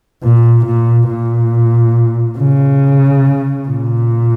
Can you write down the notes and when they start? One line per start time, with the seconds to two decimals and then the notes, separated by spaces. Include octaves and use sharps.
0.23 A#2
0.66 A#2
1.10 A#2
2.38 C#3
3.69 A#2